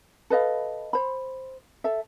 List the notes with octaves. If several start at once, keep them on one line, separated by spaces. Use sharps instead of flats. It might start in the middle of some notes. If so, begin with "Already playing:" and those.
A4 B4 D#5 F5
C5 B5
A4 E5